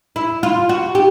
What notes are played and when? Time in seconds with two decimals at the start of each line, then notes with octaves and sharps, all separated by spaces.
0.16 E4
0.43 F4
0.69 F#4
0.95 G4